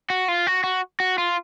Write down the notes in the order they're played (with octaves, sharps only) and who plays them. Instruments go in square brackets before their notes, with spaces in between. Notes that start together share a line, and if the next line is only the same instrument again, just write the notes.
[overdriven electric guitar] F#4
F4
F#4
F#4
F#4
F4